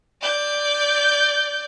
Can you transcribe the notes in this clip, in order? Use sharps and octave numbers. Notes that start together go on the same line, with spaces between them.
D5 G6